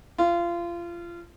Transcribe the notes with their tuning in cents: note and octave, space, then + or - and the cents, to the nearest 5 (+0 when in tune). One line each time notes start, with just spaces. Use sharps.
F4 -25